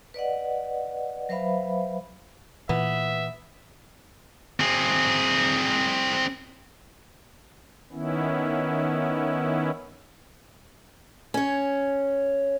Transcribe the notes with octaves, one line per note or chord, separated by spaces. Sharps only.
B4 D5 D#5 F#5
F#3 B4 C5 E5 F5 B5
A#2 E3 B3 E5
C4 G#4
D#3 B3 C#4 E4
C#4 C#5